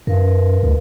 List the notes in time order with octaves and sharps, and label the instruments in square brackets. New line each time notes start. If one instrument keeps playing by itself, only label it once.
[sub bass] F#2 [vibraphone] A#4 B4 F5
[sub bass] D2